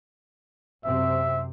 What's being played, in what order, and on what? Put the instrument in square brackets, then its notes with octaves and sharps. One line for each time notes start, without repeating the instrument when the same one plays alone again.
[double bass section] F#2 C3 C4 [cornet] E5